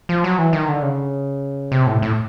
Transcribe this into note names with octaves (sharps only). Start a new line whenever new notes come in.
F3
F#3
E3
D#3
D3
C#3
C3
A2
A2